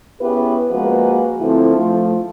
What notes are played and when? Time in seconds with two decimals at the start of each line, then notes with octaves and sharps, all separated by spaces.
0.21 B3 C#4 E4 G4 G#4 B4
0.71 F3 G#3 A#3 F#4 B4
1.41 D3 F3 A3 C4 E4
1.77 F3 A3